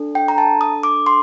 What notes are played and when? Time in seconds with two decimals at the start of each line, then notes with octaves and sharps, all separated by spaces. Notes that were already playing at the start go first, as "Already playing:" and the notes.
Already playing: D4 A4
0.15 G5
0.28 A#5
0.38 A5
0.61 D#6
0.83 D6
1.06 C6